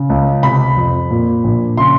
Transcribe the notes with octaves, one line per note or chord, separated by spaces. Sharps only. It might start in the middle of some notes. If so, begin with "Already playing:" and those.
Already playing: C#3
C#2
C3 B5
F2
A#2
A#1
C#3 C6